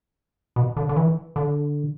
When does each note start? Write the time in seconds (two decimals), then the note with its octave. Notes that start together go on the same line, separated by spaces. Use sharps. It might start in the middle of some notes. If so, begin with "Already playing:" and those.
0.56 B2
0.77 D3
0.89 D3
0.96 E3
1.36 D3